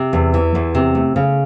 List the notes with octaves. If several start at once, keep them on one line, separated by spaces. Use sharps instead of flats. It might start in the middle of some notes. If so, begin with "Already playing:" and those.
Already playing: C3
E2
E3
E2
C3
A3
C#3